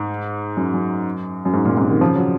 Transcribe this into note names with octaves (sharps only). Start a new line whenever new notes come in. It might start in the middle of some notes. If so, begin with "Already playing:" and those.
Already playing: G#2
F#2
F#2
F#2
G#2
F#2 A#2
G#2 C3
C3 D#3
C#3 F3
F#3